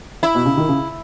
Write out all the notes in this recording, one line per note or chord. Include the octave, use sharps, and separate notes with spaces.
E4
B2
C#3
D#3
C#3